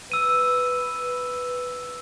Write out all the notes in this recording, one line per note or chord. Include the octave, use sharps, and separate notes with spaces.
B4 E6 D#7